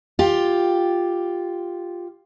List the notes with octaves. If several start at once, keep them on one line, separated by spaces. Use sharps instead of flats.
F4 G4